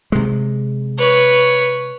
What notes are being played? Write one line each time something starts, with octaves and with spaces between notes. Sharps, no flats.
C3 G#3
B4 C#5